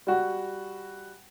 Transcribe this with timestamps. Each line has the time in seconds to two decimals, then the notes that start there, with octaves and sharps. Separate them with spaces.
0.07 G3 F#4